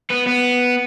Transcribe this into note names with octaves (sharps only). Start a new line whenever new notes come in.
B3
B3